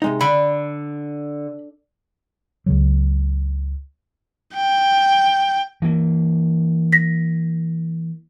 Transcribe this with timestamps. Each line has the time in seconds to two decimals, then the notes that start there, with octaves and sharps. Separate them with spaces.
0.02 C3 G#3 D#4
0.21 D3 B5
2.66 C#2 C#3 F#3
4.54 G5
5.82 E3 A#3
6.92 A#6 B6